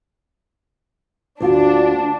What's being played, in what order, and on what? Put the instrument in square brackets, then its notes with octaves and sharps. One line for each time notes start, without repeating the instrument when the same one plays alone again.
[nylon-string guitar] D2 F4 F#4 [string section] D4